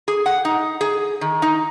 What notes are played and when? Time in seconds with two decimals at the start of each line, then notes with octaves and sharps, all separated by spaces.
0.08 G#4
0.26 F#5
0.45 D#4
0.81 G#4
1.21 D#3
1.42 D#4